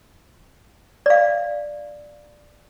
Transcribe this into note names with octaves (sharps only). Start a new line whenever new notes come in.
D5 F5